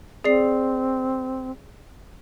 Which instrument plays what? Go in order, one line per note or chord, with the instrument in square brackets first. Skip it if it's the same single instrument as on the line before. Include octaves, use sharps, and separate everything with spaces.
[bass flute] C4 [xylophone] G#4 D5 C7